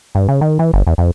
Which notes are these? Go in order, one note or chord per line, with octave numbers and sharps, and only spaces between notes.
G2
C#3
D#3
E3
G1
E2
F2